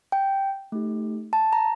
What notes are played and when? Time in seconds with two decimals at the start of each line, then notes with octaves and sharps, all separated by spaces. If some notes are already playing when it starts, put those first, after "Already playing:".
0.12 G5
0.72 A3 D#4 G4
1.33 A5
1.53 A#5